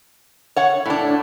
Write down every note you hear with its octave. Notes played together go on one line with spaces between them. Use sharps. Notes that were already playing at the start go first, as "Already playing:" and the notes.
C#5 F#5
A2 D4